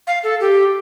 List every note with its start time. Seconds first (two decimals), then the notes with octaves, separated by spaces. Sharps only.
0.07 F5
0.24 A4
0.41 G4